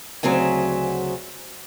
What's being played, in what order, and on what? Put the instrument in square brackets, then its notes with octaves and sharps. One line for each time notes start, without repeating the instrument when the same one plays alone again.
[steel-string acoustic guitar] D2 C#3 F#3 C4 E5 G#5